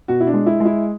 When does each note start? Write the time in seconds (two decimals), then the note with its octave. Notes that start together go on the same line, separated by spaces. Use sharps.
0.08 B2 F#4
0.20 E4
0.27 D4
0.33 G#3
0.46 E4
0.60 G#3
0.65 E4